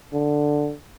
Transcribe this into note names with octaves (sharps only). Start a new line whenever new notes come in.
D3